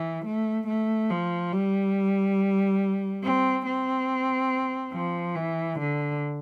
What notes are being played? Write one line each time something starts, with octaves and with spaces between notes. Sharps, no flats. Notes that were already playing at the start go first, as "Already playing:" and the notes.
Already playing: E3
A3
A3
F3
G3
C4
C4
F3
E3
D3